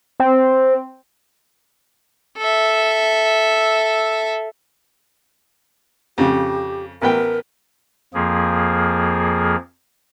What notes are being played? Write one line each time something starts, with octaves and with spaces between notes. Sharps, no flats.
C4
A4 E5
F2 C#3 G4
A1 B3 A#4 G5
F2 F3 A#3 G#4